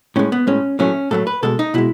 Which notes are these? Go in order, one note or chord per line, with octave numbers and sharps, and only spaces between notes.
A2 G#3 C#4
B3
A2 G#3 C#4
A2 F#3 A3 C#4
A2 F#3 A3 A4
B4
B2 G#3 A4
D#4
B2 G#3 E4